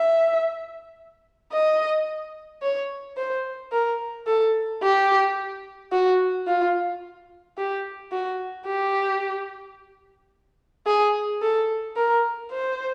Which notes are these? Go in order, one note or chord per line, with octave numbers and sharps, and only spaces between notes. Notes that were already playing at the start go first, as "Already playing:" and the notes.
Already playing: E5
D#5
C#5
C5
A#4
A4
G4
F#4
F4
G4
F#4
G4
G#4
A4
A#4
C5